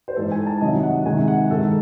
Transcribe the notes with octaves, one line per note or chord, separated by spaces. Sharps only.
C5
G#2 E3 G#3 A4
G#5
A5
C3 D#3 F#3 D#5
F#5
C3 D#3 G#3 G#5
F#5
G#2 D#3 G#3 A4